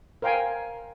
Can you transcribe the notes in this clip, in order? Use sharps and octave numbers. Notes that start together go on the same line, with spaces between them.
A#4 C5 F5 G5 G#5